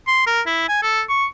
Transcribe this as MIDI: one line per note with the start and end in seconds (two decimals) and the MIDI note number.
0.07 0.23 84
0.27 0.41 70
0.46 0.65 64
0.68 0.81 80
0.82 1.02 69
1.09 1.25 85